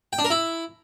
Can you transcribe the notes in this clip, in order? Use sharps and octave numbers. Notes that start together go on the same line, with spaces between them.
G5
D4
A#4
E4